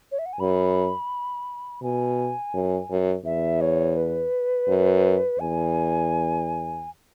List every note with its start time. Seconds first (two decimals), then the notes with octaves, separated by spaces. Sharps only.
0.12 C#5
0.19 E5
0.26 F#5
0.33 G#5
0.40 F#2 B5
1.82 B2 G#5
2.54 F#2
2.90 F#2
3.25 E2 E5
3.61 C#5
3.97 B4
4.68 F#2
5.39 E2 G#5